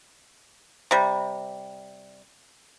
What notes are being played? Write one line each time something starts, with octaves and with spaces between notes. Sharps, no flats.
C3 G3